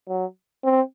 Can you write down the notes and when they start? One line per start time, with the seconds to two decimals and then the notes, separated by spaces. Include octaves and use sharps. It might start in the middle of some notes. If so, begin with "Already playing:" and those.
0.08 F#3
0.64 C4